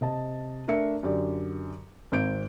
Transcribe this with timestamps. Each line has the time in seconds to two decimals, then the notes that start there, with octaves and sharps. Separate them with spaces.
0.01 C3 D#5 A5
0.67 A3 D4 A#4 E5 C#7
1.03 F#2 D3 G4 D5
2.12 G#1 C4 G6 D7